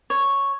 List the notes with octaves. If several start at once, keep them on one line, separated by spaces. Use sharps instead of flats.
C#5